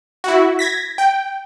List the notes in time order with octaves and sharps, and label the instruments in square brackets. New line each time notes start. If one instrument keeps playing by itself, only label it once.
[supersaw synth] E4 F#4
G#6 A#6 B6
G5